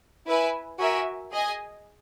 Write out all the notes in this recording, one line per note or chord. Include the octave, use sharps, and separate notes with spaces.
E4 B4 E5 G#5
F#4 A#4 E5 G#5
G#4 D#5 G#5